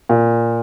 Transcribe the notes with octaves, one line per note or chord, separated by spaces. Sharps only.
A#2